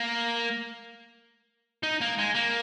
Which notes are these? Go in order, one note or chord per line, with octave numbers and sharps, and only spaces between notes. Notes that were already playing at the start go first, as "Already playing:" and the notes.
Already playing: A#3
D#4
A#3
G#3
A#3